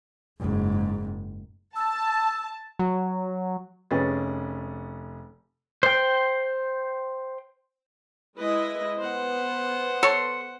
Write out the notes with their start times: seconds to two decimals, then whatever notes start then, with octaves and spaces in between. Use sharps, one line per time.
0.40 F#1 G#2
1.76 A5 E6
2.79 F#3
3.91 F1 C#4 G#4 B4 A6
5.83 C5 G5
8.38 G#3 E4 B4 D#5
8.98 B3 C5 F#5
10.03 A4 C#5 C6 C#7